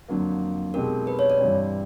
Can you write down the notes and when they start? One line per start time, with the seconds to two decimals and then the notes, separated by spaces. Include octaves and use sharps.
0.08 F2 D3 F#3 A#3
0.74 B2 G#3 C4 D#4 G4 A#4
1.07 B4
1.19 C#5
1.30 D5
1.40 G2 E3 G3 C4